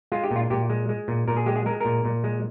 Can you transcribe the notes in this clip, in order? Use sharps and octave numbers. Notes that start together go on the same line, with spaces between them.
G#3 F4
G4
A#2
F4
A#2 G4
G#3
G#3
A#2
A#2 A#4
G#4
G#3 G4
G#4
G#3 A#4
A#2 A#4
A#2
G#3